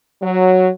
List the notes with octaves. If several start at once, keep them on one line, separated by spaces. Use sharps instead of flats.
F#3